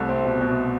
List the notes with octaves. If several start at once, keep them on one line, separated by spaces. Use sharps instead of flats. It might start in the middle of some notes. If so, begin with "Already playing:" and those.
Already playing: C2 A3
C4
B2
B2